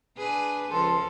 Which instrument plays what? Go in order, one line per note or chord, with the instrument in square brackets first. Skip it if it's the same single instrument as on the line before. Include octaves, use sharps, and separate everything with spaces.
[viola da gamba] D4 G#4 B4
[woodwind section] C#2 A5 C6 [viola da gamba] F3 A4